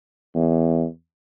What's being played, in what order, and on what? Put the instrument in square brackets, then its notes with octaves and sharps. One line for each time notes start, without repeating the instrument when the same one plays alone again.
[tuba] E2